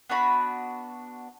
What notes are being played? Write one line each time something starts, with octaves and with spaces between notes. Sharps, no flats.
B3 D4 F#4 B5